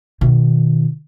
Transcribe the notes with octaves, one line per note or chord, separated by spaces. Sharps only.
B2 D#3